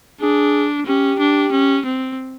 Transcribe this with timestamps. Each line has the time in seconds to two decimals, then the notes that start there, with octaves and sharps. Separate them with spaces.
0.21 D4 G#4
0.86 C#4 G4
1.19 D4
1.52 C#4
1.85 C4